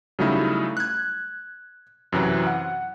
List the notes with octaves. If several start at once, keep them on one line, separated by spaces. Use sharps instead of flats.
C#3 F#3 G3 A3 D#4 E4
F#6 G#6
F#2 C3 E3 F#3
F#5